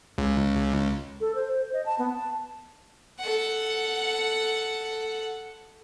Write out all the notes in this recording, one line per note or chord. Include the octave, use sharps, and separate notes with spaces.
C#2
A4
C5
C5
D#5
A5
B3
A5
A4 F#5